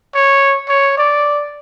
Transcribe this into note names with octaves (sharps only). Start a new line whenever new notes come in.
C#5
C#5
D5